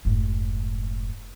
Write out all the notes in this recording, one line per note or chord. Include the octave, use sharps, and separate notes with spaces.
F1 G#2